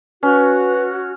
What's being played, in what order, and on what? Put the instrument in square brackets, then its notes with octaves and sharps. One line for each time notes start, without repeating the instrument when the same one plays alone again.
[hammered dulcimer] C#4 [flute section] F#4 [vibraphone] B4